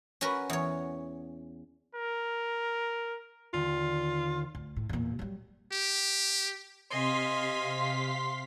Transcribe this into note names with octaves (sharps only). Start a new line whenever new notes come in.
C#4 F#4 A#4 B4
E2 C#5
A#4
D#2 D3 F4
D2
A2
E2 A#2
F#3 G3
G4
C3 D#5 F5 G#5 C6 B6